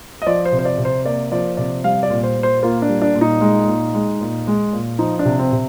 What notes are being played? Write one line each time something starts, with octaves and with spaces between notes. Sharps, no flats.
D#5
F3 D5
C5
C3
C5
D5
C3
C5
A#3 D5
F3 D5
C3 D5
G3 F5
D5
A#2
C5
A#2
C5
A#3 F4
D4
G3
D4
A#2
D#4
G#3
A#2
G#3
A#2
G#3
A#2
F3 D#4
D4
C3
C4
C3